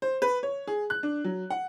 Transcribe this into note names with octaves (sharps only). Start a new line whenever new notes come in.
C5
B4
C#5
G#4
F#6
D4
F#3
F#5